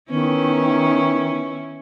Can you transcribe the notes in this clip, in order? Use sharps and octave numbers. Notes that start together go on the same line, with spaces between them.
D#3 B3 C#4 E4